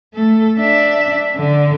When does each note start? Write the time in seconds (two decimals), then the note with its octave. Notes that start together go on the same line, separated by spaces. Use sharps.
0.14 A3 A4
0.58 D4 E5
1.36 D3